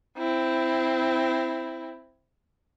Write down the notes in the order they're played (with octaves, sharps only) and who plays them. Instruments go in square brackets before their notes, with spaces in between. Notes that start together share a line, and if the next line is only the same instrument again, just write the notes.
[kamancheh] C4 E4